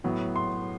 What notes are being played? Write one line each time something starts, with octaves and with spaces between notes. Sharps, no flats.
A2 F#3 B3
C6